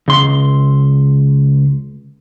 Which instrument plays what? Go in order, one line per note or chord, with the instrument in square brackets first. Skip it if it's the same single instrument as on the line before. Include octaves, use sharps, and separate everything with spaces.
[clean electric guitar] C#2 C6